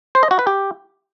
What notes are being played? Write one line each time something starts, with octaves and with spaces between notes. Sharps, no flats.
C5
D#5
F#4
B4
G4